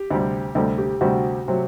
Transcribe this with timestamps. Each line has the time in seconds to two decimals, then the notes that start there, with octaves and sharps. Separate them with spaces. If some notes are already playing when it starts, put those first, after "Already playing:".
Already playing: G4
0.11 D2 C3 G3
0.55 D2 C3 G3 A4
0.78 G4
1.01 D2 C3 G3 F#4
1.48 C3 F#3